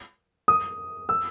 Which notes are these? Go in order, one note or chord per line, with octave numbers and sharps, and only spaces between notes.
D#6
E6